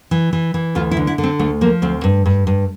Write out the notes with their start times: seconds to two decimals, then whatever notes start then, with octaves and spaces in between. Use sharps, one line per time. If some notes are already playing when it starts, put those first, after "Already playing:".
0.11 E3
0.33 E3
0.54 E3
0.75 D2 F4
0.91 E4
0.97 D3
1.07 E4
1.18 D3
1.24 C4
1.39 D2 A3
1.61 F3 A#3
1.82 D2 C4
2.04 G2
2.26 G2
2.47 G2